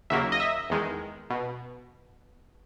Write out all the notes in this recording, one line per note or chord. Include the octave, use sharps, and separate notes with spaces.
D#2 C#3 F#3 A#3 E5
D#5
E5
E2 D#3 G#3
B2